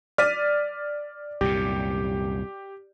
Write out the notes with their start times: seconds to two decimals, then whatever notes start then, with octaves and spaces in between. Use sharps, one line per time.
0.18 D5 F6 B6 D#7
1.41 C2 F#2 A#2 G4